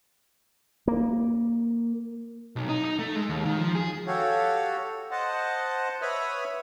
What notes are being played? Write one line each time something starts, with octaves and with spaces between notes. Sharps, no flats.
A#3
B1
D#4
D#4
A3
G#3
D#2
D#3
F3
G#4
F#4 G4 A4 C#5 F5
C5 D#5 F#5 A5
B4 C#5 E5 B5 D#6 F6